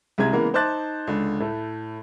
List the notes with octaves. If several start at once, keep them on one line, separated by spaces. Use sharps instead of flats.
C2 C3 G#3 A#5 G#6
C#3 E3 G#3 A#3 B3 A#4
D#4 C5 A5 D6 F#6 A6
C#2 D3
A2 A3